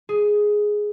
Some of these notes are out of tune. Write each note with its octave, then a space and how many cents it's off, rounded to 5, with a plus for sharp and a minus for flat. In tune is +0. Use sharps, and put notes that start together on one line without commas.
G#4 +5